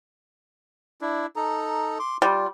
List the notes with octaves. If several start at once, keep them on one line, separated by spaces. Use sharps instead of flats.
D4 E4
D#4 A4 A#5
C6 D6
G3 F4